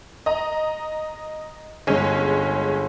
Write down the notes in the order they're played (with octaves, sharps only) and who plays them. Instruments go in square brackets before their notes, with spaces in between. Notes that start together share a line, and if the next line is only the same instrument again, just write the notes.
[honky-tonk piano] D#5 A#5
[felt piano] G1 [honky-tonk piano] G#3 C#4